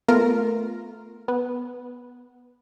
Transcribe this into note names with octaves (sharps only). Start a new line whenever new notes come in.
A3 B3 F4 A#4
B3